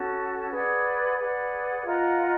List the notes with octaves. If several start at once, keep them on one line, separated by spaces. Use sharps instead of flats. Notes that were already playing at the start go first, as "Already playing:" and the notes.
Already playing: C#4 F#4 A4
G#4 B4 D5 F#5
G#4 B4 D5 F#5
F4 A#4 D#5 F#5